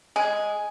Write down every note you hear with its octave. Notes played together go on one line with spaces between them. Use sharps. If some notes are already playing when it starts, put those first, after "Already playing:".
G#3 G#4